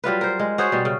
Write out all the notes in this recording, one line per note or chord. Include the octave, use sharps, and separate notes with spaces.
F#3 G3 F4 B4
A#4 C5
G#3
F#4 G#4 C5 C#5
B2 G3
C#3